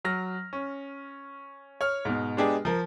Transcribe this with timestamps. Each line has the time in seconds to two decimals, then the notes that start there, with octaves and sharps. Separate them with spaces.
0.05 F#3 F6 A#6
0.53 C#4
1.81 C#5 F6
2.05 G#2 B2
2.37 G#3 B3 D4 G4 G#4
2.65 F3 A#4